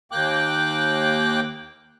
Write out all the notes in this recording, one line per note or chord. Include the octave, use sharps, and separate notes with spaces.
D#2 A#3 G5 D6 F#6